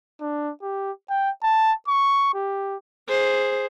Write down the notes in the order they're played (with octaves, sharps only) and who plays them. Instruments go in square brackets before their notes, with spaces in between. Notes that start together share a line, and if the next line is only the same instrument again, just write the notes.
[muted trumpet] D4
G4
G5
A5
C#6
G4
[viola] G#4 C5